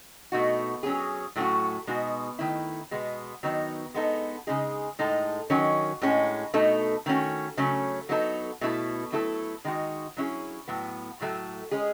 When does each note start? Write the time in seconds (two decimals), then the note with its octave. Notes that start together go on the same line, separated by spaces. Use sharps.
0.32 B2 A3 D#4 F#4
0.83 F#3 C#4 G#4
1.36 A2 F#3 A3 C#4 F#4
1.87 B2 G#3 D#4 F#4
2.39 D#3 A3 E4
2.91 B2 G#3 B3
3.43 D#3 F#3 B3 D#4
3.94 G#3 B3 D#4 A4
4.47 C#3 G#3 D#4 G#4
4.99 A2 G#3 D#4 A4
5.50 D#3 F#3 C#4
6.02 A2 G#3 C#4
6.54 B2 A3 D#4 A4
7.06 D#3 A3 C#4 F#4
7.57 C#3 F#3 A3 C#4
8.09 F#3 B3 D#4 A4
8.61 B2 A3 E4 A4
9.12 F#3 A3 E4 A4
9.65 D#3 G#3 D#4 F#4
10.17 F#3 C#4 E4 G#4
10.68 A2 F#3 B3
11.21 A2 F#3 A3
11.71 G#3 C#4 G#4